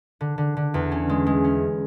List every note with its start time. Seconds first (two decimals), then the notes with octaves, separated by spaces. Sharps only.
0.21 D3
0.38 D3
0.57 D3
0.74 E2
0.92 C#4
1.09 G#3
1.26 G#3
1.44 C#4